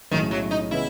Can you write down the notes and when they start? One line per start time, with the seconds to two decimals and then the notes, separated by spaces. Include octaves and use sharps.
0.11 B1 A2 D#3 G#3 C#4 E4
0.31 F#3
0.51 D#4
0.71 C#3 E3 B3 E4